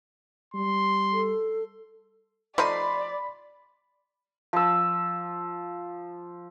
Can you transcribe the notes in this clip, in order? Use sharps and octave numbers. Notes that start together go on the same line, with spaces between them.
G3 C6
A4
F3 A3 D#4 D5 B5 C6
F3 E6